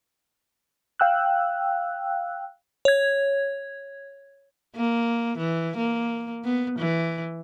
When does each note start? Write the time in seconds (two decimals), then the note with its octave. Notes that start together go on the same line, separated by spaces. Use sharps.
0.99 F5 G5 E6 F#6
2.85 C#5 G#6
4.76 A#3
5.38 E3
5.77 A#3
6.44 B3
6.79 E3